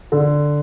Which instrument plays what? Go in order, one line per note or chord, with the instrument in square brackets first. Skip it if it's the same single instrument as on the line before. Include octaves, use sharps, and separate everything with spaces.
[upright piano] D3